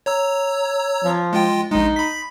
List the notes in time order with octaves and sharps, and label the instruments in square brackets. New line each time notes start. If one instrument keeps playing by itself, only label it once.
[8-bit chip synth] C#5 A#5 E6
[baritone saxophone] F3
[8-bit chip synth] G#3 F4 G5
[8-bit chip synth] A#1 G#3 [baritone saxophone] D#4
[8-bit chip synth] B5 B6